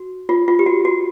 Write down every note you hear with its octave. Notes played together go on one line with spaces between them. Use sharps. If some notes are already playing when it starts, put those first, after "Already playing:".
Already playing: F#4
F4
F4
G4
F#4
F#4